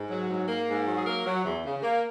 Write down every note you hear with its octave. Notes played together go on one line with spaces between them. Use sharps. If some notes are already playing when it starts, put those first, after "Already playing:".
Already playing: G#2
F#3
G#2
A#3
G#2
F#3
G#4
A#3 A#4
F#3
E2
C#3
A#3